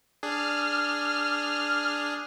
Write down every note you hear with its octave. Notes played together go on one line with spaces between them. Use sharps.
D4 G#4 F6